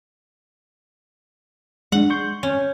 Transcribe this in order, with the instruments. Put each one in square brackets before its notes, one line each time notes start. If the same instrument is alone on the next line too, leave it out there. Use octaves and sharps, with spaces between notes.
[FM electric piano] G#3 D4 [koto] F#5
[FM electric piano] C6 C#6 G6
[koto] C#4